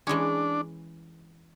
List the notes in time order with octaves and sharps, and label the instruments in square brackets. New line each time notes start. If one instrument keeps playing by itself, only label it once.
[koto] E3 G#3 C#4 [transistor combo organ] D4